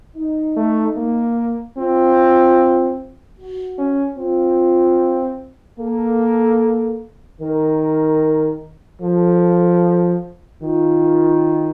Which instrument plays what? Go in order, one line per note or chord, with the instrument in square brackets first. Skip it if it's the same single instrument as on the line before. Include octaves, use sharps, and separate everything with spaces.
[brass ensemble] D#4
[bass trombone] A3
A#3
[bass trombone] C4 [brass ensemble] F4
[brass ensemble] F#4
[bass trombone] C#4
[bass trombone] C4 [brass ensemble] F4
[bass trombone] A#3 [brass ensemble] A4
[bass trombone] D#3 [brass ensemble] A#4
[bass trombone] F3 [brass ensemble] A4
[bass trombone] D#3 [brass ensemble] F4